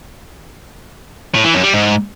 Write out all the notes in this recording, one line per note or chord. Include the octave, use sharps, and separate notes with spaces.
A2
E3
F#2
G3
G#2